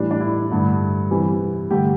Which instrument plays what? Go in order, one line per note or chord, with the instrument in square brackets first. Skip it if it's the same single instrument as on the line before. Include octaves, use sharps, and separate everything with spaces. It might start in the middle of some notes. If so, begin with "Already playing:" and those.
Already playing: [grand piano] A2 E3 G3 D4
D4
E4
G2 D3 A3
C3 E3 G3
G2 D3 A3 G4